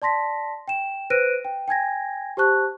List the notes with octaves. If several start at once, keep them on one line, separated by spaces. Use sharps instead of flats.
D5 A5 C6 A#6 B6
G5 E7
B4 C5 F#6 A#6 D7 D#7
G5
G5 G#5 G#6 A#6
G4 C5 A5 C#6 F#6